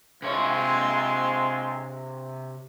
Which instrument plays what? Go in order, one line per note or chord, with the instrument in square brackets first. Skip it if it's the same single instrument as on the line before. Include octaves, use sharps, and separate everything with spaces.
[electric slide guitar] C3 C#5 [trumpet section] G#3 C4 F4